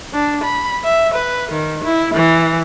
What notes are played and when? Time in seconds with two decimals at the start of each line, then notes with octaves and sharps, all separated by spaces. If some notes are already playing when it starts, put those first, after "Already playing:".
0.13 D4
0.44 B5
0.84 E5
1.14 B4
1.52 D#3
1.84 E4
2.14 E3